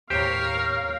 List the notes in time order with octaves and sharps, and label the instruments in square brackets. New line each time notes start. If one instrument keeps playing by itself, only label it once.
[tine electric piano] D#2 A2 [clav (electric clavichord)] G4 C5 [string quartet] A#4 C#5 [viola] F5